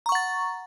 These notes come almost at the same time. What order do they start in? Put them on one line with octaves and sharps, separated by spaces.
A#5 C#6 F#5 A6